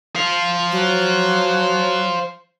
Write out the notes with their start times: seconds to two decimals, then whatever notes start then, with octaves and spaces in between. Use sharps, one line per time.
0.16 C5 F5
0.72 F#3